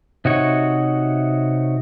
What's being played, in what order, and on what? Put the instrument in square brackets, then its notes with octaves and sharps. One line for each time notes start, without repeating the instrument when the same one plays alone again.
[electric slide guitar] C3 D#4 F#4 C#5